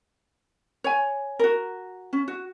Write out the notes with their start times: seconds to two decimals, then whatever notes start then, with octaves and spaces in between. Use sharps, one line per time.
0.84 C#5 G#5
1.39 F#4 A#4
2.13 C#4
2.28 F#4